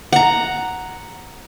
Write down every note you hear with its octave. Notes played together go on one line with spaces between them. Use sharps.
F#5 A#5